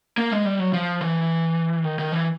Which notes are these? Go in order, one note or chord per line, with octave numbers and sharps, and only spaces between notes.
A#3
G#3
G3
F#3
F3
E3
D#3
D#3
E3